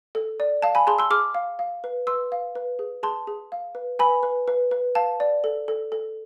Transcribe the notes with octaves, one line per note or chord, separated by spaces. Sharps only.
A4
D5
F5 A5
G#5 B5
G#4 A5 C6
C6 E6
G#4 D6 F6
F5
F5
B4
B4 C6 E6
F5
B4
G#4
G#4 A5 C6
G#4
F5
B4
B4 G#5 B5
B4
B4
B4
F5 A5
D5
A4
A4
A4